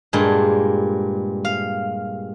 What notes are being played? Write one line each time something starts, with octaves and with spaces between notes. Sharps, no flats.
G2 A#2 G#3
F5